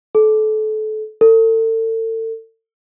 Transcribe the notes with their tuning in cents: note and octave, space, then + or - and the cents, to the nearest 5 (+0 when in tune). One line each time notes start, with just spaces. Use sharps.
A4 -30
A4 +35